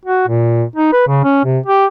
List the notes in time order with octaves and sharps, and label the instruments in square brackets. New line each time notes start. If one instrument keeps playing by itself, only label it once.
[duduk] F#4
A#2
D#4
B4
C#3
C#4
C3
G4